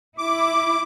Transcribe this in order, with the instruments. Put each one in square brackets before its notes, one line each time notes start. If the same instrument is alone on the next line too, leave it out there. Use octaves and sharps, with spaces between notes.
[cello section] E4 [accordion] D6